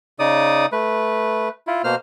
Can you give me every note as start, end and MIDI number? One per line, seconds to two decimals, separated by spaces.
0.19 0.66 49
0.19 0.66 63
0.19 0.66 74
0.19 0.66 87
0.72 1.49 57
0.72 1.49 71
1.67 1.82 64
1.67 1.82 65
1.84 1.95 47
1.84 1.95 58
1.84 1.95 72
1.84 1.95 89